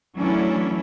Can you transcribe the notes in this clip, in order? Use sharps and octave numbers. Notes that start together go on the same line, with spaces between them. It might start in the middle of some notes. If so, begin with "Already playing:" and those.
E3 F#3 A3 C#4 D4 E4